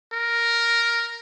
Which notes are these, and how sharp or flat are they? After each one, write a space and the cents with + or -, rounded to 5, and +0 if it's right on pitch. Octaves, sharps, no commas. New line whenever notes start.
A#4 +0